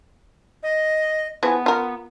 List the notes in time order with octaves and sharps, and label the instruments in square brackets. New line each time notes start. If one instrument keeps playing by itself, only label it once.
[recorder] D#5
[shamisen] E3 F3 G#4 [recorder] B3
[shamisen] F4 A#4